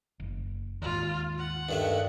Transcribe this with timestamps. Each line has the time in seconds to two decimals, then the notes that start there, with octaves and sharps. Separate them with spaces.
0.20 F#1
0.82 D#2 G#2 F4
1.38 F#5
1.69 G2 D#3 A3